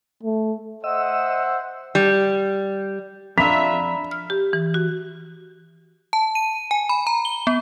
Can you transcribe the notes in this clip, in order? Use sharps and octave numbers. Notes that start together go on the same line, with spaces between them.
A3
C5 D#5 E5 F#5 E6
G3
F2 D4 F4 E5 A#5 B5 B6 F7
F6
G4
E3
F#4
A5
D#7
G#5
B5
A#5
G7
B3